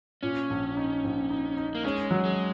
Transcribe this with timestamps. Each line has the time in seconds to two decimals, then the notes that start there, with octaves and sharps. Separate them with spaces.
0.23 A#2 C#4
0.50 A#1
0.77 D#4
1.04 A#1
1.30 D#4
1.57 D#4
1.75 A#3
1.84 G#3 C#4
2.11 F#3
2.25 G#3